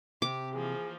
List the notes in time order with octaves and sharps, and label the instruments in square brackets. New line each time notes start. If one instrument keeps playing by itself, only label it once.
[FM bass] C3 [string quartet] G4 [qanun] D6
[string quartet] E3 F3 A#3 [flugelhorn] G#4